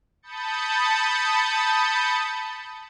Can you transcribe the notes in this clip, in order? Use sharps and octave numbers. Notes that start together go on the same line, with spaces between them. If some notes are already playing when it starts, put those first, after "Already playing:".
A5 B5 D#6 G6 A6 C#7